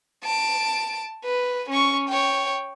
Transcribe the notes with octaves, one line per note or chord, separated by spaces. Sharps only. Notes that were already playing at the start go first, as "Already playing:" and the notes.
A5 D7
B4
C#4 C#6
C#5 G5